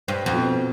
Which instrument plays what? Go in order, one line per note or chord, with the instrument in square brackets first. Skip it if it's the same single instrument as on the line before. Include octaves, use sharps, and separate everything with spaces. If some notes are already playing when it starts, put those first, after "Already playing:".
[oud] G2 [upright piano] C5
[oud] F2
[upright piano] B2